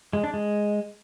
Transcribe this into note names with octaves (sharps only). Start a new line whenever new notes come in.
G#3
D4
G#3